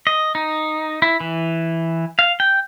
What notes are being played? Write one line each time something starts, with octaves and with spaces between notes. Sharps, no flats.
D#5
D#4
E4
E3
F5
G5